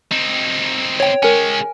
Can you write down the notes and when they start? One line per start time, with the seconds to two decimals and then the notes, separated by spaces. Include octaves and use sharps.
0.12 C4 D#4
1.00 C#5 G5
1.23 G#3 C#4 A#4 G#5